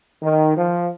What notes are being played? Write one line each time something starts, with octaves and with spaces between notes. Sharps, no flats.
D#3
F3